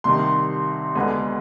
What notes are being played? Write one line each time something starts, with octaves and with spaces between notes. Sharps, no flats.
C2 C3 D#3 C6
D2 D3 G#3 B3